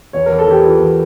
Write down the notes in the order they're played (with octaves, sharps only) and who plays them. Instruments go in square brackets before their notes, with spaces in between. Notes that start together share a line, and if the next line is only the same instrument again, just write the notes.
[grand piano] E2 C#5
E2 A#4
A4
E3 G4
E3 F4
E2